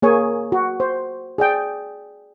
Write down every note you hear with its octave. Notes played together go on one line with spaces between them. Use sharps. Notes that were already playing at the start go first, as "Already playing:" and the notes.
A#3 G#4 C#5 G#5
F#4
C5
G#4 D5 G5